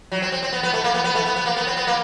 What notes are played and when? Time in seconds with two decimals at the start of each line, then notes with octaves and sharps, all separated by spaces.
0.12 F#3
0.22 C4
0.32 C4
0.43 C4
0.53 B3
0.63 B3
0.74 A3
0.84 A#3
0.94 B3
1.04 B3
1.15 A3
1.26 B3
1.36 B3
1.46 A#3
1.57 B3
1.67 C4
1.77 B3
1.87 A#3